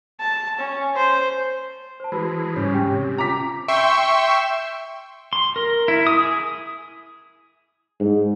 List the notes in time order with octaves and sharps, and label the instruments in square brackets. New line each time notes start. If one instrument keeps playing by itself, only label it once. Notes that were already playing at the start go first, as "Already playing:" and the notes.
[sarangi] A5
C#4
C5
[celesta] C5 A5
[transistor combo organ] E3 G#3 [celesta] F#4 B4 B5
[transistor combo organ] G#2 C#3 G3 [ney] C#4 [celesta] C#5
[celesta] G4 G5
[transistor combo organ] C3
[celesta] F4 [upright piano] A#5 D6 B6
[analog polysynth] E5 G5 C6 C#6 E6
[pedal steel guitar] C6
A#4
E4
D#6
G#4
[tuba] G#2